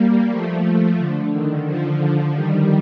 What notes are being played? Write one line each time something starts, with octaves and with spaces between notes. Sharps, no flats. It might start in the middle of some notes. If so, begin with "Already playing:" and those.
Already playing: G3 A#3
F3 A3
D3
D#3
D3 F3
D#3 G3